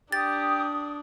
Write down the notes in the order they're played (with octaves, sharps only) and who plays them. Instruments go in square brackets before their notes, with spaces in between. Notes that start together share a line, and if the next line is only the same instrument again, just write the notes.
[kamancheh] D4 [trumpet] G4 [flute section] D#6 [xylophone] A6